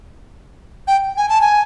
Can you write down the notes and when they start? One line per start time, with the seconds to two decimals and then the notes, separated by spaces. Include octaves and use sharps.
0.87 G5
1.17 G#5
1.29 A5
1.41 G#5